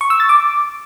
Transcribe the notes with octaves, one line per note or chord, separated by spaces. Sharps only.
C#6
E6
A6
D6